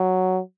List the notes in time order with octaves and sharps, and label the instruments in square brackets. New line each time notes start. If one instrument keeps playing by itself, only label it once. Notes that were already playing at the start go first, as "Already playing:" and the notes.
Already playing: [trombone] F#3